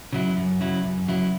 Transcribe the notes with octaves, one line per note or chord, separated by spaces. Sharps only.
C#3 F#3 E4
F#2
C#3 F#3 E4
F#2
C#3 F#3 E4